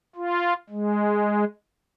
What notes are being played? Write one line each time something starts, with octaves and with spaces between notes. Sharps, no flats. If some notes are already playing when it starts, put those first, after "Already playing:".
F4
G#3